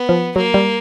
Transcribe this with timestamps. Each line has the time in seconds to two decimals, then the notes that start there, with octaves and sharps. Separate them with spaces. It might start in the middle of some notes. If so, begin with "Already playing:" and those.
Already playing: B3
0.09 F3
0.36 F#3 A#3
0.54 G3